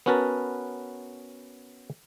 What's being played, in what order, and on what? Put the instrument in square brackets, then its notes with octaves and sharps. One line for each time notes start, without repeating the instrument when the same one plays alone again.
[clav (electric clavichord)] B3 C#4 F#4 A#4 B4 A5